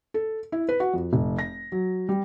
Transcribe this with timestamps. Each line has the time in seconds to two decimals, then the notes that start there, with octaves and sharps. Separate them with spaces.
0.14 A4
0.52 E4
0.69 B4
0.80 F#4
0.94 F2
1.13 F1
1.39 A#6
1.72 F#3
2.09 G3